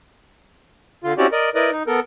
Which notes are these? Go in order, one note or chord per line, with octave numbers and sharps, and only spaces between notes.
D3 F4
C4 C#4 E4 F#4 G4 D5
A#4 D5 D#5
E4 A#4 B4 D5 D#5
D#4
B3 A4 A#4